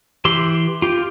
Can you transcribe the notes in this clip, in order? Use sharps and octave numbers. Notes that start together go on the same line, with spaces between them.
E3 G4 C6
F4 G4